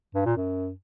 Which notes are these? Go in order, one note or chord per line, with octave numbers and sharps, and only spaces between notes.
G2
A#2
F#2